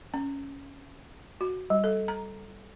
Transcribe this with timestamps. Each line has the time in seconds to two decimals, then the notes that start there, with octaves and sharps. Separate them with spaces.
0.14 C#4
1.41 F#4
1.70 G3
1.84 A4
2.08 A#5